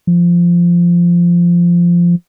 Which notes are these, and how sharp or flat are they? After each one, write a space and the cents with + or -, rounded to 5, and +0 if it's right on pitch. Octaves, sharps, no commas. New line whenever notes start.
F3 -10